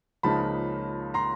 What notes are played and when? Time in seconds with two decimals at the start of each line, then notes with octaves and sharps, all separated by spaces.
0.23 C#2 C#3 F3 A#3 D#4 A5 B5
1.14 A#5 C6